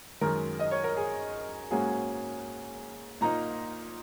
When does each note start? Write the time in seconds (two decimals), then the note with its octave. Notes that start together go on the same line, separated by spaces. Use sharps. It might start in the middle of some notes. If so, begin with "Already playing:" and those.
0.21 F#2 D#3 G#3 A#4
0.59 D#5
0.71 C#5
0.84 A#4
0.96 G#4
1.71 G#2 F#3 A#3 C#4 G#4
3.21 A#2 A#3 D#4 A#5